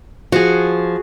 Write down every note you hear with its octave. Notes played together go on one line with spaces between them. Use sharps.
F3 F#4 G#4